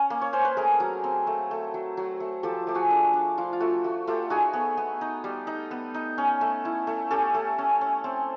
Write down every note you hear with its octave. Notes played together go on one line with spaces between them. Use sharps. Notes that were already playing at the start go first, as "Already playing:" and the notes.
Already playing: C#4
A#3
C#5
C#4 C5
B4
A3 G#4 A#4
F#3
C4
A3
A3
F#3
F#3
A3
F3 G4 A4
A3 G4
F#4 G#4
D4
D4
F3 F4
F4
A3 F#4
A3 F#4
A3 F4 G4
D#4 F#4 G#4
B3
B3
D#4
G3
D#4
B3
D#4
C#4
A3
E4
A3
C#4 G4 A4
A3
C#4
C#4
C4